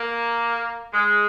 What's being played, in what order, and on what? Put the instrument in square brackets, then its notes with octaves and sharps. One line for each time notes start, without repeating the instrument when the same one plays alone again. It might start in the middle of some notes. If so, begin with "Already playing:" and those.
Already playing: [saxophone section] A#3
G#3